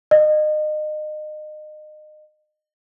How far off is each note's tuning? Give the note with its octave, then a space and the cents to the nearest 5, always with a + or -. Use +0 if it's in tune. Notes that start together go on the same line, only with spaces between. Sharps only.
D#5 -30